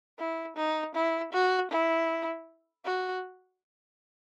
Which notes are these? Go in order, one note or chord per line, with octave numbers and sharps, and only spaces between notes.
E4
D#4
E4
F#4
E4
F#4